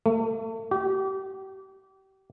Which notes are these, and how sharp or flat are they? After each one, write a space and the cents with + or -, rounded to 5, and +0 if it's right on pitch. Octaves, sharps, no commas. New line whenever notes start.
A3 +35
G4 -30